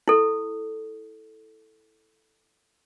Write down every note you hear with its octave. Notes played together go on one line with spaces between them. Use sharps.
E4 A4